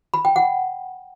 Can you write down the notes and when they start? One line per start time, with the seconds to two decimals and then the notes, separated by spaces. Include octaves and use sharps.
0.14 B5
0.25 G5
0.36 F#5